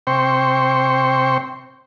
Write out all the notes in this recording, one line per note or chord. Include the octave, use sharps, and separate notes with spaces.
C3 C5 G5 C#6